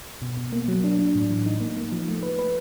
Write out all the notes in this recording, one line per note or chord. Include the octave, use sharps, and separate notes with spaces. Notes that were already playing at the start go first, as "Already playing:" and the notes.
B2
B2
A#3
F#3
D4
D4
A2
E3
D#4
A#3
A#3
F3
A3
B4
B4